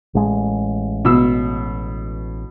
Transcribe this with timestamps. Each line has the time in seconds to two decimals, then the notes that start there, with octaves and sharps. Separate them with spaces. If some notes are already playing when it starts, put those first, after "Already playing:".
0.15 A1 G#3
1.05 B2 E6